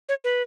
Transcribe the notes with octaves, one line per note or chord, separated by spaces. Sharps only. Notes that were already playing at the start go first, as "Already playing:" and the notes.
C#5
B4